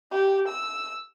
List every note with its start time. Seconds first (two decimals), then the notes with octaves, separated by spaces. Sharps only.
0.12 G4
0.48 E6